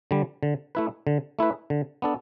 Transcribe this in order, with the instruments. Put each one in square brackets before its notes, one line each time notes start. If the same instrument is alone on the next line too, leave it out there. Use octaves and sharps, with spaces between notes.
[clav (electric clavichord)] D3 G3
D3
A3 E4 B4
D3
A3 E4 B4
D3
B3 D4 A4